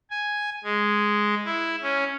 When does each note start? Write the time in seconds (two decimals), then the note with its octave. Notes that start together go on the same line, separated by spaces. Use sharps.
0.11 G#5
0.64 G#3
1.45 E4
1.82 C#4